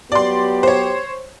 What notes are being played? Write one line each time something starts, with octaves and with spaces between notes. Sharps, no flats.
F#3 B3 G4 D5 C6
C5 C#5